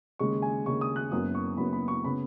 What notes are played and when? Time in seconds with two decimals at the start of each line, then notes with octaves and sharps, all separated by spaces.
0.19 D#2 C#3 G#3 C#6
0.42 G#5
0.66 D#2 C#3 G#3 C#6
0.81 D#6
0.96 F#6
1.12 F#1 F#2 F#3 B3 D#6
1.35 C#6
1.57 F#1 F#2 F#3 B3 B5
1.73 B5
1.88 C#6
2.04 C#3 B3 B5